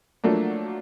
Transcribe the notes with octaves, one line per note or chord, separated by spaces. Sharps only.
F3 F#3 A3 A#3 D4